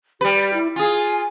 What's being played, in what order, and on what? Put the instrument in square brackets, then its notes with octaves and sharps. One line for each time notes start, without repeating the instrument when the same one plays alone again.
[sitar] G3 B4 [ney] G4
[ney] E4
[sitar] F4 G#4 [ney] G#5